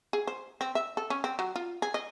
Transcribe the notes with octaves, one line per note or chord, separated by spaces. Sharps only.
G#4
C5
C4
E5
A4
C#4
C4
F#3
F4
G#4
D#5